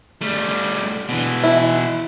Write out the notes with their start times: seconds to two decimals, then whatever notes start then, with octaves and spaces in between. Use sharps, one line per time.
0.21 G3 A3
1.09 B2 E3
1.44 E4